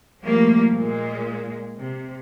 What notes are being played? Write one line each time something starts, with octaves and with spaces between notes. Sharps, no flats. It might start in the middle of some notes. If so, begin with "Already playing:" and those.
F3 G3 A3 A#3
A#2 G#3
C3